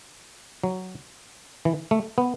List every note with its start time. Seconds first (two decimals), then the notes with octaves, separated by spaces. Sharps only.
0.64 F#3
1.65 E3
1.91 A3
2.18 B3